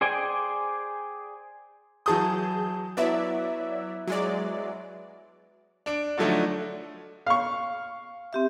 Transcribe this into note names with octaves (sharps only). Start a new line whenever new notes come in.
G#4 C5 D5 G5 G#5
E3 F#3 G#4 A5 D#6 G6
F#3 B3 E4 D5 E5
F#3 G#3 D5
D4 D7
D3 F3 F#3 A3 D4 D#4
F5 C#6
C4 G4 E5